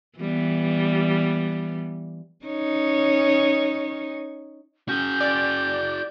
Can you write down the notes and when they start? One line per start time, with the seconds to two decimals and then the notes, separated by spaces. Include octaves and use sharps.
0.19 E3 G3 B3
2.45 C#4 D#4 C#5
4.89 C#4 F#4 G#4 G6
5.21 D5